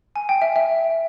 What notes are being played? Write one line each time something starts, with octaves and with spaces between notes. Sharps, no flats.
G#5
G5
E5
E5